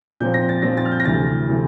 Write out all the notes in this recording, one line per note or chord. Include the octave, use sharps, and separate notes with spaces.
A#2 F3 C4 G6
A#6
A6
A#2 F3 C4 A#6
A6
F6
G6
A#6
D2 C3 E3 A3 A6
C3 E3 A3